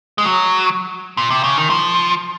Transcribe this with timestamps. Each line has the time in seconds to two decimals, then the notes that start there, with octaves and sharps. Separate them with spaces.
0.18 G#3
0.25 F#3
1.17 A#2
1.30 C3
1.44 C#3
1.56 D#3
1.70 F3